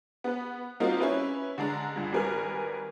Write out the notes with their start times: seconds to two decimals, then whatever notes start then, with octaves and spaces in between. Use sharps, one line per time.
0.24 B3 B4
0.80 G3 A#3 C4 D#4 F4 F#4
1.01 C#4 E4 B4
1.58 D3 G#3 D4 A#5
1.96 C#2 G2
2.13 G#1 G3 A#4 B4 G#5 F6